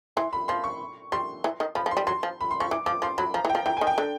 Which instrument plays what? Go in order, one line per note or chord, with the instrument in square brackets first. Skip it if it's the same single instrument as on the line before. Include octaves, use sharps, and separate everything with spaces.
[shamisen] E3 [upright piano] C6
[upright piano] B5
[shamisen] F3 [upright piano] C6
[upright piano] C#6
[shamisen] G3 [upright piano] C6
[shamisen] E3
D#3
[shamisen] F3 [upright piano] B5
[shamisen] F3
[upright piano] C6
[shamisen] G3
[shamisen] F#3 [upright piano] C6
[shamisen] F3
[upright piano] B5
C6
[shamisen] F3 [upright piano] C#6
[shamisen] E3 [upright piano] D6
[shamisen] F3 [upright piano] D6
[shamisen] F3 [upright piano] C6
[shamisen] F#3 [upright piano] B5
[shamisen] F3 [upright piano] A#5
[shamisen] E3
[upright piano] G5
[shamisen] F3
[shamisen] E3 [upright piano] G5
[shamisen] D#3 [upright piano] G#5
[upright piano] G5
[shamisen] D3